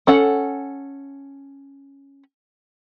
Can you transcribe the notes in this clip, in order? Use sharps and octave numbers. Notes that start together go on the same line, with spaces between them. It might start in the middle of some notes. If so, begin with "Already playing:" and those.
C#4 A4 F#5